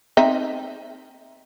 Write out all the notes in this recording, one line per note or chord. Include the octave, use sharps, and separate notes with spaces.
C4 D#4 E5